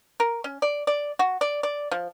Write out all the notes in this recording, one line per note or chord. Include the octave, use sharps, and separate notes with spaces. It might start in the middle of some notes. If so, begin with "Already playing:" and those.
A#4
C#4
D5
D5
F#4
D5
D5
F3